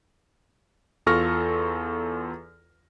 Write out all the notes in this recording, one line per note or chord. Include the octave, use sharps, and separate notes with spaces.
E2 F4 A4 C#6 F6 A#6